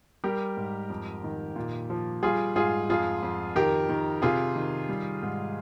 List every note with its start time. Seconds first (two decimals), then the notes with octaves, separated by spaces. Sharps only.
0.24 G3 G4 A#4
0.57 G#2
0.90 F2
1.24 D#3
1.56 A#2
1.90 F3
2.23 G3 F4 G#4
2.56 G#2 F4 G#4
2.90 F2 F4 G#4
3.23 F2
3.56 D#3 G4 A#4
3.89 D#3
4.22 C3 F4 G#4
4.56 D#3
4.89 G3
5.23 G#2